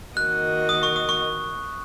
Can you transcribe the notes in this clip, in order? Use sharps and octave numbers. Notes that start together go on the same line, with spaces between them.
D#3 A#3 F#4 D#5 F#6
D#6
C#6
D#6
C#6